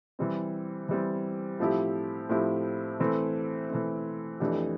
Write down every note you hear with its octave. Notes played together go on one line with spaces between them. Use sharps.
E3 G3 C4
E3 G3 C4
A2 F3 C4 E4 G4
A2 F3 C4 E4 G4
E3 A3 C4
E3 A3 C4
F2 E3 A3 D4 G4